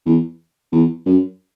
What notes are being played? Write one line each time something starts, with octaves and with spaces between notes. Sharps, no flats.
E2
E2
F#2